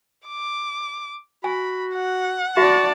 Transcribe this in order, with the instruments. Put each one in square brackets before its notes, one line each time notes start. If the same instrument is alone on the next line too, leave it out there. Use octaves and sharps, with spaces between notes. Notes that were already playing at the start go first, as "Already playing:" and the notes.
[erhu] D6
[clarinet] F#4 [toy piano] G#5 [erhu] B5
[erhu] F#5
[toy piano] F#4 E5 [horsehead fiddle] D5 A5 [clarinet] C#6